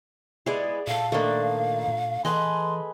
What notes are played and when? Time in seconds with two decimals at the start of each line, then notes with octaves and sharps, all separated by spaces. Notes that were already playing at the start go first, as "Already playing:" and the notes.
0.46 G#3 B3 E4 G#4 D5
0.87 A#2 A3 A4 F5
1.12 D#3 F3 A3 A#3 D4
1.88 A#2
2.25 E3 G#4 A4 B4 D#5 C6